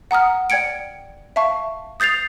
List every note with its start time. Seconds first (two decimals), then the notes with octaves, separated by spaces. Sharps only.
0.11 F#5 A#5 D#6 F6
0.50 D5 G5 G#6 C#7 D7
1.36 E5 F5 A5 C#6
2.00 D#6 G6 A6 C7 F7